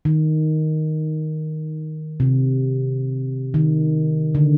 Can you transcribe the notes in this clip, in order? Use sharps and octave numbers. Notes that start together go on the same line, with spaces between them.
D#3
C3
D#3
D3